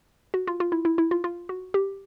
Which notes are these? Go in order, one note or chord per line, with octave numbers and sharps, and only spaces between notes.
F#4
F4
F4
E4
E4
E4
F4
F4
F#4
G4